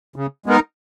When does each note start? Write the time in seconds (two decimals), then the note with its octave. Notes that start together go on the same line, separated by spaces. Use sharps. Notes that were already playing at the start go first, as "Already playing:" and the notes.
0.16 C#3
0.46 G#3 B3 D#4 A#4